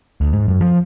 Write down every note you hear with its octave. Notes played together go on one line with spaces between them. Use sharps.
D2
G#2
F#2
F3